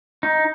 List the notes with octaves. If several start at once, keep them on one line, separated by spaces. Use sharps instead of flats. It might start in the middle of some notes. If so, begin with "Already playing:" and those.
D#4